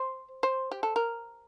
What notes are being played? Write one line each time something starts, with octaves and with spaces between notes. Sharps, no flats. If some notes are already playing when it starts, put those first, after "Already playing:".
Already playing: C5
C5
G4
A4
A#4